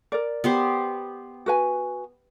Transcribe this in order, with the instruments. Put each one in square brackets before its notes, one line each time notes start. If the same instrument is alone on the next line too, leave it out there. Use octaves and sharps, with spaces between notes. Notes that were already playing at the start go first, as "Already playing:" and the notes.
[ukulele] A#4 D5
[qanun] B3 G4 C5
[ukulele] F#4 B4 G#5